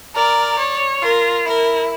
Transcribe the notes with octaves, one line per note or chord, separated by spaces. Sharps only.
A#4 D5
C#5
F4 A#4
E4 A#4